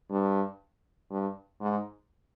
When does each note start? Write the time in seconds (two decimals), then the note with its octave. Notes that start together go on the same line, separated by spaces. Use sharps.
0.11 G2
1.11 G2
1.61 G#2